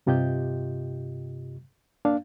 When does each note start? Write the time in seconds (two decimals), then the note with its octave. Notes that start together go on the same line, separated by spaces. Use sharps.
0.06 G2 C3 F4 G4 D#5 G6
2.05 A#3 D4 F5